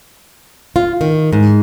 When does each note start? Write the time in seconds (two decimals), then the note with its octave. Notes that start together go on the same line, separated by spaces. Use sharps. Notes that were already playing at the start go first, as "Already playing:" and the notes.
0.76 F4
1.01 D#3
1.33 G#2